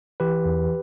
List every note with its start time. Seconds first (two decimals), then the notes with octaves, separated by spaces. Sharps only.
0.20 E3 G4 B4
0.45 E2